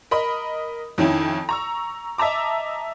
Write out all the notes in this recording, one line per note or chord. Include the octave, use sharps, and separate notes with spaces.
A#4 D#5 B5
F2 D#3 C#4 E4
A#5 C#6 E6
D#5 E5 A5 A#5 D6